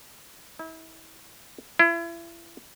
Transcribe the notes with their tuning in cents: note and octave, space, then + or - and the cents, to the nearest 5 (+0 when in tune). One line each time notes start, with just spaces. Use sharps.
E4 -35
E4 +35